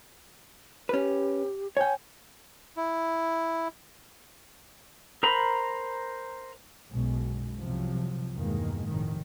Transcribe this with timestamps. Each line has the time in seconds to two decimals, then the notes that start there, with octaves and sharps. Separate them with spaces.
0.89 C#4 G4 B4
1.77 C#5 G5 G#5
2.77 E4
5.23 A#4 C5 A#5 B5
6.92 B1 F#2 B2 G#3
7.59 C2 C3 F3 F#3
8.32 E2 G2 B2 D#3 G#3 A#3
8.84 F1 A2 D#3